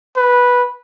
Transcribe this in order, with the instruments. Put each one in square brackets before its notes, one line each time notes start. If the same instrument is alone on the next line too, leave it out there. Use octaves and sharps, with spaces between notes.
[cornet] B4